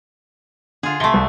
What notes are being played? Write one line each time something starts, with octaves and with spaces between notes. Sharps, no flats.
D3 F4 G#4
C3 A3 C6 G7
C2